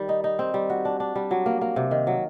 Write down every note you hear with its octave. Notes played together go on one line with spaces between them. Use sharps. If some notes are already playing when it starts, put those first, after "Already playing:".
Already playing: D#3 G3
D#4
D#4
C4
G3
F#4
D4
D4
G3
F#3
A#3
A#3
C3
D#3
F#3